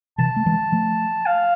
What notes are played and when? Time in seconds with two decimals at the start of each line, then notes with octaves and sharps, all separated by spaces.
0.18 C3 E3 A5
0.36 A3
0.46 E3 G#3
0.72 F3 A3
1.26 F5